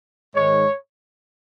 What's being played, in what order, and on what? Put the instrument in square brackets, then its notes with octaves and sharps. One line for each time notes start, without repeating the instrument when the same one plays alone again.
[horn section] G#2 D#3 G#3 C#5